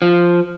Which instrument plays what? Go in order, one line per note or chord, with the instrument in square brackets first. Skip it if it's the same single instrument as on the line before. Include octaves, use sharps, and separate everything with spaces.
[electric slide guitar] F3